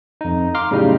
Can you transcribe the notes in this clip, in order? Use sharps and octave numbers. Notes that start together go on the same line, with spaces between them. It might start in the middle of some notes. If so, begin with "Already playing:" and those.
F2 D#4
F5 A#5 C6 D6 F6
A2 C#3 F#3 G3 D#4